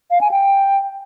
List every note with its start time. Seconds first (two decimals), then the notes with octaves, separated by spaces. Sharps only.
0.11 F5
0.21 G#5
0.31 G5